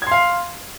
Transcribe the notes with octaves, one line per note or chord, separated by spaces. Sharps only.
F5 C6 G#6